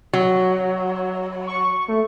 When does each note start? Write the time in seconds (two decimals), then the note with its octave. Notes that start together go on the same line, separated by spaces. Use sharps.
0.13 F#3
1.47 C#6
1.88 A3